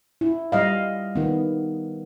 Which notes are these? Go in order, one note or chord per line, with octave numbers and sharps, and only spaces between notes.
E4
G3 D#5 F5
D#3 B3